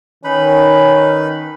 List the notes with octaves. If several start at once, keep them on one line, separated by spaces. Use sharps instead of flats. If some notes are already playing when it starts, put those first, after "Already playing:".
D#3 C#4 D#4 B4 B5